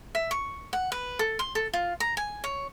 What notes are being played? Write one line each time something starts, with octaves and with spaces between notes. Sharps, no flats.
E5
C#6
F#5
B4
A4
C6
A4
F4
A#5
G#5
C#5